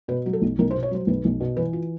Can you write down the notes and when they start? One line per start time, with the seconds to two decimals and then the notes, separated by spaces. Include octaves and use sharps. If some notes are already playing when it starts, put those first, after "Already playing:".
0.08 B2 B4
0.26 F#3
0.33 A4
0.42 B1
0.59 B1 A#4
0.71 C5
0.74 B2
0.83 C#5
0.91 F#3 C5
1.07 B1 B4
1.25 B1
1.40 B2
1.57 E3 B4
1.73 F4